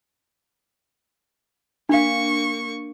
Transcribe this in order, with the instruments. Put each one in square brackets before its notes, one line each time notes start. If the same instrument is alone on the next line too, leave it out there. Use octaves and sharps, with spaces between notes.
[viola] A#3 C#6 [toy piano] D4 F5